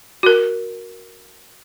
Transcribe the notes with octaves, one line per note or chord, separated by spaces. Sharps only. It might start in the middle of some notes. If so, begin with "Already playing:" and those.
F#4 A#4